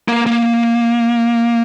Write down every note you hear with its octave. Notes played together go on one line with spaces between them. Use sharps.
A#3
A#3